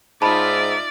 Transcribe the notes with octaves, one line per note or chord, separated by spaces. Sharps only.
G#2 D#4 F4 D5 E5 A5 B5